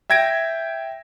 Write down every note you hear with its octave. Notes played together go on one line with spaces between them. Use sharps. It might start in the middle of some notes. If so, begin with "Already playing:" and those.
E5 G5 G#6 A#6 D7